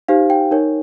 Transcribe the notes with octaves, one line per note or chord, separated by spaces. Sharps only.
D#4 G4 C5 F5
G5
D#4 A#4 C#5